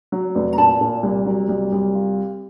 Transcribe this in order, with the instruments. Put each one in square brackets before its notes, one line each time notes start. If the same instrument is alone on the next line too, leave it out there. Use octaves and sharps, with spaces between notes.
[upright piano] F#3
F1
[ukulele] A#5
[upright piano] A#2 [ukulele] A5 B5
[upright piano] A#2
C2
F#3
C2
C2
F4